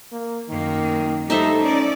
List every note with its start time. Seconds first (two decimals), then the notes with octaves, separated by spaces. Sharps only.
0.12 A#3
0.49 F#2 D#3 A#3
1.30 G3 A3 D#4 A4 C5 E5
1.60 C#4 D5 D#5